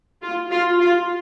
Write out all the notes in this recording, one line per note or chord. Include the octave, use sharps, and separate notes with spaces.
F4
F4
F4